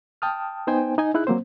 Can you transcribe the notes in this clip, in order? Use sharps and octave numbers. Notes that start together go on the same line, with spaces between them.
G5 A5 D#6 F6
B3 D#4 C5 G5 G#5
D#4 D#5 G#5
D#4 E4 G#4 F#6
F#3 A#3 C4 C5